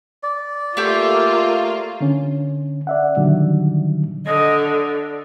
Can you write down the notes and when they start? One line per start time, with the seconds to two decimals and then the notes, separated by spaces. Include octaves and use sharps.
0.23 D5
0.77 A3 A#3 F4 G4
2.01 D3 C#4
2.87 D5 E5 F#5
3.17 A#2 D3 D#3 F#3 G3
4.26 D3 D#5
4.73 D5